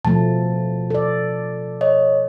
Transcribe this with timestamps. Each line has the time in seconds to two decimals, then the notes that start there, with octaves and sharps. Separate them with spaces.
0.05 B2 F3 A3 A5
0.90 A4 D5
1.81 C#5 D#5